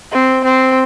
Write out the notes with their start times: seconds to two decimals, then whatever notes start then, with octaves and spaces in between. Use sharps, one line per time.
0.12 C4
0.44 C4